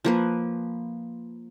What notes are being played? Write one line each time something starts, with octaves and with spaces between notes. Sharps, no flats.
F3 A#3 B4